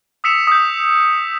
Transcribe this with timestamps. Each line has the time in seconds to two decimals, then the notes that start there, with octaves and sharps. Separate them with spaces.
0.24 D#6 E6 B6 C#7 E7 F7
0.47 D#6 E6 G6